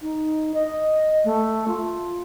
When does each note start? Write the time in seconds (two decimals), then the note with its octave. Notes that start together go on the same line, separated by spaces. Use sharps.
0.02 D#4
0.54 D#5
1.24 A3
1.68 F4